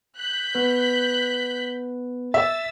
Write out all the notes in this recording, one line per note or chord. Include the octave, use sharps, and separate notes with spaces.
F#6 G6 B6
B3 B4
E5 E6 A6